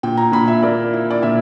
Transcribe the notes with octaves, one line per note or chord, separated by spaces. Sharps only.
A#2 G5
A#5
A#2 B5
E5
A#3 D5
E4
D5
A#2 E5